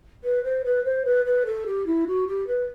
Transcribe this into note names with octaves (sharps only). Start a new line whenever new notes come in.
B4
C5
B4
C5
B4
B4
A4
G4
E4
F#4
G4
B4